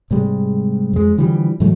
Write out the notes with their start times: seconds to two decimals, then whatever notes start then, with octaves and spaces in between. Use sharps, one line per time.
0.11 G#2 C3 G3 G#3
0.93 F2 G#3
1.18 D3 E3 F3 G3
1.60 G#2 E3 F#3 A3